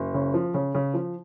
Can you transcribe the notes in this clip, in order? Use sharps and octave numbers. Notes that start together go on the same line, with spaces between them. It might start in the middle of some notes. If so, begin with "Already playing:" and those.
Already playing: F#1
C#3
F3
C#3
C#3
F3